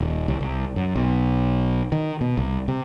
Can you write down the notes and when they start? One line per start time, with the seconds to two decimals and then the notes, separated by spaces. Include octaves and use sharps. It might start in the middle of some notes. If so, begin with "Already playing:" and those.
0.01 D#1
0.28 C2
0.40 C2
0.76 F#2
0.96 B1
1.92 D#3
2.21 B2
2.37 C2
2.68 C3